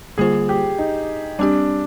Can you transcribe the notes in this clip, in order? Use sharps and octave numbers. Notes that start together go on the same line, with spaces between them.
D3 G3 A#3 F4 G#4 C5
G4
D#4
G3 C4 D4 G4